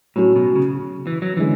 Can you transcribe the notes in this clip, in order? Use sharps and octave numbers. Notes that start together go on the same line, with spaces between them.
A2 F#3 C#4 F#4
B2
C#3
E3
F#3
D3 E3 G#3 C#4